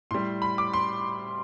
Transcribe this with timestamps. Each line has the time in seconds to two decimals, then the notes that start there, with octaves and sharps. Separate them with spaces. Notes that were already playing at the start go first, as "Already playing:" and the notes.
0.11 A2 G3 C6
0.42 B5
0.58 D6
0.73 C6